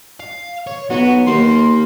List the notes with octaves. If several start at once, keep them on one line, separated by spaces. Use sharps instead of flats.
F5
C#5
B1 B3 F#4
D#2 A#3 C6